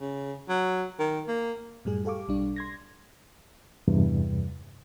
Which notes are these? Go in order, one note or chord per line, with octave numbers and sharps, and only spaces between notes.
C#3
F#3
D#3
A#3
F#2 A2 G3 G#4
G4 A4 F5 C#6 D6
B1 G3 D4
C6 G#6 A#6
E2 G2 C3